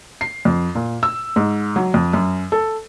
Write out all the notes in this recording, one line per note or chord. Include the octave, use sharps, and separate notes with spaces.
C7
F2
A#2
E6
G#2
F#3
F2
F#2
A4